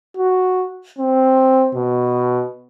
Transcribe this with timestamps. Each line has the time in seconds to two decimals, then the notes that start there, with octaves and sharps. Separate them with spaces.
0.17 F#4
0.99 C4
1.75 B2